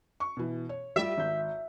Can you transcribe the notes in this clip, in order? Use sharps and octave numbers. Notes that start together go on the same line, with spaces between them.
C#6
B2 E3
C#5
G3 F4 G4 E5
G#1 G6